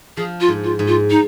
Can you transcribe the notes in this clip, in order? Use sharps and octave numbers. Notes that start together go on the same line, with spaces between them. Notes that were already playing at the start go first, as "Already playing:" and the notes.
F3 G#4
F4
G#2
F4
G#2
F4
D#4